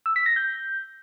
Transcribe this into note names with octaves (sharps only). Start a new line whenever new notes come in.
E6
B6
A#6
G6